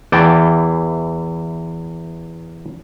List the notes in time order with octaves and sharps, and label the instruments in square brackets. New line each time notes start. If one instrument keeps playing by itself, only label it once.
[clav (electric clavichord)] E2 E3 D5 G5 A5